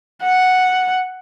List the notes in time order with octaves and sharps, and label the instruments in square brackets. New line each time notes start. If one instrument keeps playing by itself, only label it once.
[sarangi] F#5